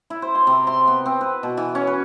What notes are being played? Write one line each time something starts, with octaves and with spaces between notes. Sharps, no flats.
E4
C5
C6
C3
C6
B3
C4
B4
B2
E3
C#4
B4